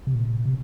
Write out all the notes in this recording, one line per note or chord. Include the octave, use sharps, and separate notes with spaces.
C3
A#2
C3